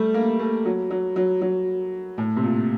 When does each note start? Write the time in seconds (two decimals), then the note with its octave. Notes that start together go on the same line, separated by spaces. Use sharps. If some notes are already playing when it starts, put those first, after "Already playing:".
Already playing: G3 A3
0.14 A#3
0.39 A3
0.65 F#3
0.91 F#3
1.16 F#3
1.41 F#3
2.18 A2
2.36 C3
2.43 A#2